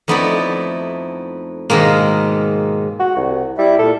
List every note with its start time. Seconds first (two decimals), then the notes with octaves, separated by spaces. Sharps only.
0.08 F2 A3 B3 D#4 E4 D5
1.70 G#2 B2 D#3 G#3 A#3
2.99 F#4
3.16 C2
3.58 G3 E4 E5
3.79 A#2 A4